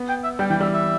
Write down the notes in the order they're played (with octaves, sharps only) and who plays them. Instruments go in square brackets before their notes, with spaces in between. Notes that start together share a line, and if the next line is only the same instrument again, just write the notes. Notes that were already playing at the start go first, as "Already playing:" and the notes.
Already playing: [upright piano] B3
[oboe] G5
E5
[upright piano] G3 [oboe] G5
[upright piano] E3 [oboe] G5
[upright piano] G3 [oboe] E5
[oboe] E5